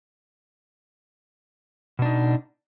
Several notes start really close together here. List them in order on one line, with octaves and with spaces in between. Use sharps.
B2 D4 D#4